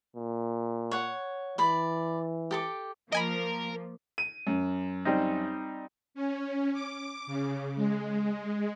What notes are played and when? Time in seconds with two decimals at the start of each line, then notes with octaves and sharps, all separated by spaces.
0.17 A#2
0.91 C#5 F#5
1.58 E3 D5 B5
2.51 G4 A4 D6
3.12 F3 A#3 A#4 D#5 G#5 B5
4.18 D#7
4.47 F#2
5.05 G3 C4 D#4
6.14 C#4
6.73 D6
7.27 C#3
7.75 G#3